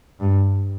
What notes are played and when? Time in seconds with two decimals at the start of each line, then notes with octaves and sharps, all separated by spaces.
0.20 G2